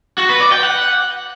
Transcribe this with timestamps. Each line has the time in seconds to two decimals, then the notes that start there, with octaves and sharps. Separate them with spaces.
0.18 F#4
0.29 B4
0.41 D5
0.52 G5
0.63 F#5